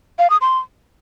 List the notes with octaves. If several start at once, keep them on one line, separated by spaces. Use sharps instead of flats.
F5
D#6
C6